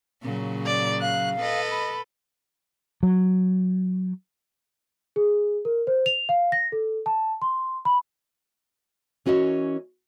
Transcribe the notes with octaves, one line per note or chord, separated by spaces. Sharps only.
A#2 C#3 F#3
D5
F5 F#6
A4 B4 D#5
B5
F#3
G#4
A#4
C5
F7
F5
A#6
A4
A5
C6
B5
E3 C#4 F#4 A#4 D#5